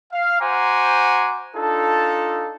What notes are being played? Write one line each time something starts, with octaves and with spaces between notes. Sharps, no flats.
F5
F#4 C5 F#5 G#5 A#5 D6
D4 D#4 F4 A4